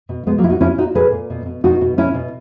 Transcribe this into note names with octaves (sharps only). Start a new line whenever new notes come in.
B2
B2 G#3 B3
F#3 A#3
B2 E4
D#4 F#4
A#2 C#4 E4
A#2 D#4 F#4
A#2 G#4 B4
A#2
B2
B2
B2 D#4 F#4
B2
B2 C#4 E4
B2